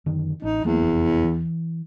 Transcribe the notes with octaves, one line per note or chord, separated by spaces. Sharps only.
F#2 D3 D#3
A1 D4 D#4
E2 F#3 A3 A#3
F1
E3